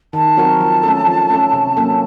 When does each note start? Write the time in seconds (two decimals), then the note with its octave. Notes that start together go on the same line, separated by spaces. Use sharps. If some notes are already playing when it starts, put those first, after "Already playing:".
0.13 D#3 A5
0.37 F#3 C4 F#4 A#4
0.60 F3
0.83 A3 C#4 A4
1.07 F3
1.30 A3 C#4 A4
1.53 C3
1.77 F#3 A#3 C#4 A4